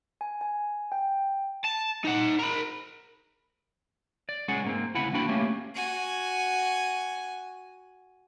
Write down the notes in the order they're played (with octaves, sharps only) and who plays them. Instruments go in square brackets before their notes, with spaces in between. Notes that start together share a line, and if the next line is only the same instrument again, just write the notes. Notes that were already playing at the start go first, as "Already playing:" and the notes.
[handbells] G#5
G#5
G5
[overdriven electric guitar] A5
D#4 F#5
A#4 B5
[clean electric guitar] D5
G#3 C#4 G#4 F#5
G#2 A#3 C4
D2 C#3 E4 F#5 B5
A#3 D4 F#4 G5 B5
A3 A#3 C#4 G4
[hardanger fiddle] F#4 G#5